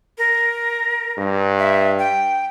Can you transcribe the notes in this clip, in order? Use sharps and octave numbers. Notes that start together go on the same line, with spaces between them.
A#4
G2
E5
G5